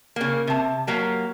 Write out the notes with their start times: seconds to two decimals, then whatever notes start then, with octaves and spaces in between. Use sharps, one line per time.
0.16 C#3 A#3
0.47 C3 A5
0.87 F#3 A#3 G4